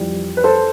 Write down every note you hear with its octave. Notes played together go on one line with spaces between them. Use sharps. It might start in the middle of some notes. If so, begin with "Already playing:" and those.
Already playing: F2 E3 G3
B4
A4 C5